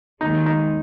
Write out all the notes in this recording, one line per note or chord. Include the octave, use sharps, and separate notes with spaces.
D#2 D#3 G#3 D#4
D#4